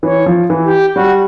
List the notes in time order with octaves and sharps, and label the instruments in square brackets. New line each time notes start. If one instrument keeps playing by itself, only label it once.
[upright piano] E3 [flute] C#5
[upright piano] F3
E3
[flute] G4
[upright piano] G3 [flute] F#4